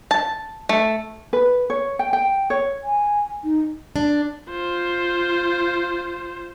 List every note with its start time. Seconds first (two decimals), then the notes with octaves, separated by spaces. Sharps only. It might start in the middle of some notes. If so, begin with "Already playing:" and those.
0.11 A5
0.69 A3
1.33 B4
1.70 C#5
1.99 G5
2.13 G5
2.50 C#5
2.83 G#5
3.44 D#4
3.96 D4
4.49 F4 C5